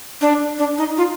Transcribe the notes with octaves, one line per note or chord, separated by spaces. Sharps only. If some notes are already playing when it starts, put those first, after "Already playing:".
D4
D4
D#4
F4